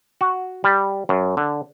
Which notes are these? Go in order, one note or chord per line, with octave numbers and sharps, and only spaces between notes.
F#4
G3
F#2
D3